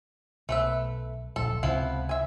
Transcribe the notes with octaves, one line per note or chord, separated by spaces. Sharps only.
B1 A3 B4 E5
D1 A#1 A4
C#2 C3 F3 B3 E4
E5 G#5